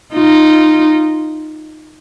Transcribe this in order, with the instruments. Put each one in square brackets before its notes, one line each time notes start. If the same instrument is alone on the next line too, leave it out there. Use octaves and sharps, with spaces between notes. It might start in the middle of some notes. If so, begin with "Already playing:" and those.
[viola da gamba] D#4 F4